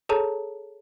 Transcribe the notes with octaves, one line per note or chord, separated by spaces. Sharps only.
G#4 A4 C#5 A5 A#5